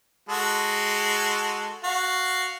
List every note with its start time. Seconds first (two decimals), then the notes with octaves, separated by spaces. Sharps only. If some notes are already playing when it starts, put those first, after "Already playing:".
0.29 G#3 F#4 A4
1.84 F#4 F5